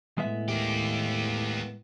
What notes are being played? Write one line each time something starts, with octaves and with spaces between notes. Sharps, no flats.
A2 G#3 B3 E5
A#3 G4